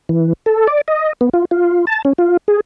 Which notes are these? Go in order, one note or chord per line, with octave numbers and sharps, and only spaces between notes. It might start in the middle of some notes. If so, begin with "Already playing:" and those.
E3
A4
D5
D#5
B3
F4
F4
A5
C#4
F4
G#4